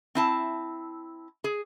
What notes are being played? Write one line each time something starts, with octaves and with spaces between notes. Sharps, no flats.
C4 E4 A5
G#4